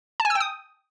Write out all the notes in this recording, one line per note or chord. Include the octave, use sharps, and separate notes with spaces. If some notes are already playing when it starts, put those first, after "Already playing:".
A5
G#5
E6
G5
D#6